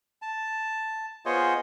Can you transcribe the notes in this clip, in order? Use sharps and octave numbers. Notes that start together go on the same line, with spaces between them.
A5
B3 F4 G#4 C5 C#5 D#5